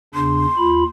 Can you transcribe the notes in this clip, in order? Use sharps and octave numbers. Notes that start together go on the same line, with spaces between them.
E2 C#3 D4 C6
D#2 F4 B5